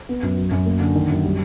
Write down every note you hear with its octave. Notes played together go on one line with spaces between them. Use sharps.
B3
F#2
F#3
F#2
A#3
D3
D#3
F#2
G3